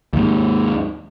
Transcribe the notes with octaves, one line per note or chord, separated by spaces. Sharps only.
D#2 G#2